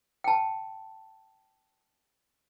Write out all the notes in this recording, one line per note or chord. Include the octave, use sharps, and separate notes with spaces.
G5 A5